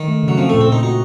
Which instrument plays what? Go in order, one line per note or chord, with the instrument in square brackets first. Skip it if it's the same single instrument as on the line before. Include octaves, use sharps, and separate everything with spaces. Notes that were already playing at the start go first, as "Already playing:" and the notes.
Already playing: [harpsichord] D#3
[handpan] A3
C#3
[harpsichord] F#3
[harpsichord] F3 [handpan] C4
[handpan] A#2 [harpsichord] A3
[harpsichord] C4
[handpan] A#2 [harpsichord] D#4
[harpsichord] D#4 [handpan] F#4